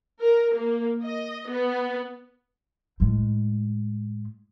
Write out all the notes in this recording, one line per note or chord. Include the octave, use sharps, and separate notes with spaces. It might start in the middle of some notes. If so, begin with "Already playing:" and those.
A#4
A#3
D#5
B3
A2 G#3